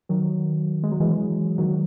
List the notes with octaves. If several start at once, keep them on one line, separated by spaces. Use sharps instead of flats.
D#3 F#3
G#3
F#3
E3 G#3
D#3 F#3